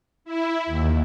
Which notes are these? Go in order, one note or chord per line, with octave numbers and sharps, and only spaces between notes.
E4
D#2